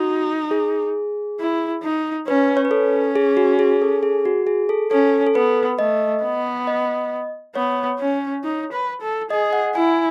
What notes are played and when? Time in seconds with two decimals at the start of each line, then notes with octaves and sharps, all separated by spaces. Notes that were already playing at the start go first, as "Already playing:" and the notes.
Already playing: D#4 F#4
0.51 G#4
1.39 E4
1.83 D#4
2.28 C#4 B4
2.57 C#5
2.65 B4
2.71 C#4 A4
3.16 G#4
3.37 F#4
3.59 G#4
3.82 A4
4.03 G#4
4.25 F#4
4.47 G#4
4.69 A4
4.91 C#4 A4
5.27 A4
5.35 B3 B4
5.79 A3 D#5
6.23 B3
6.67 D#5
7.55 B3 C#5
7.99 C#4
8.44 D#4
8.72 B4
9.02 A4
9.31 G#4 D#5
9.53 F#5
9.74 E4 G#5